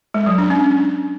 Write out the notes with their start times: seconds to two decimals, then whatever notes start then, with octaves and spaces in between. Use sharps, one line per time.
0.14 G#3
0.26 F#3
0.38 D4
0.50 C#4